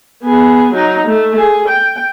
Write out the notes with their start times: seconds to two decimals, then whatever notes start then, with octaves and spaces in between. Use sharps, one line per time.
0.23 B3 G#4
0.73 F#3 D#4
1.07 A3
1.37 G#4
1.68 G5